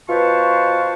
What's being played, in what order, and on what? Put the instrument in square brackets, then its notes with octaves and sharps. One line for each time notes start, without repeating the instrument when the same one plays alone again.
[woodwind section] B2 F4 B4 C5 A5 C#6